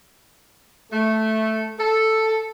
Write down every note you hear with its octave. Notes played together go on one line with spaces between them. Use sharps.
A3
A4